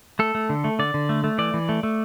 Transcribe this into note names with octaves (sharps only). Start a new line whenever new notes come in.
A3 A4
A3
D3
A3
D3 D5
D3
A3
A3
E3 D5
E3
A3
A3